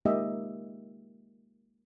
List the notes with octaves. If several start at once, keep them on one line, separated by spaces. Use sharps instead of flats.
G#3 A#3 D#4 G4 D#5 E5